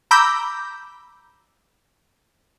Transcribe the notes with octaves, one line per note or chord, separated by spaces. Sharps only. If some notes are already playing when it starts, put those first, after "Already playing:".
A#5 B5 D6 E6 G6